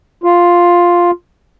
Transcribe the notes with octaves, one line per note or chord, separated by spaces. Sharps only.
F4